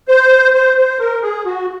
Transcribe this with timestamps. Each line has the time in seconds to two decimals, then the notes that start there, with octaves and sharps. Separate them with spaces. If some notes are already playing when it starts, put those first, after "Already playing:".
0.08 C5
0.54 C5
0.77 C5
0.99 A#4
1.22 G#4
1.46 F#4